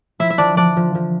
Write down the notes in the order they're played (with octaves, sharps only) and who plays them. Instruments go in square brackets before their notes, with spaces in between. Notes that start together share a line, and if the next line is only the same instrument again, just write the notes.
[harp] F3 [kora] E4 E5
[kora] E5
[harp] F3 [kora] D4 D5
[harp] F3 [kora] D4 D5
[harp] F3
F3